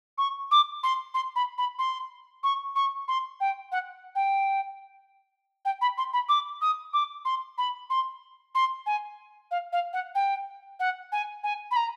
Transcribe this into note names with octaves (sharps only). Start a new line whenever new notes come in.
C#6
D6
C6
C6
B5
B5
C6
C#6
C#6
C6
G5
F#5
G5
G5
B5
C6
B5
D6
D#6
D6
C6
B5
C6
C6
G#5
F5
F5
F#5
G5
F#5
G#5
G#5
B5
A#5